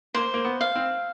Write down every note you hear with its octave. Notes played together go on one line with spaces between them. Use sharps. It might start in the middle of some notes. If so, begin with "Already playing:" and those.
A#3 C5
A#3
B3
F5
C4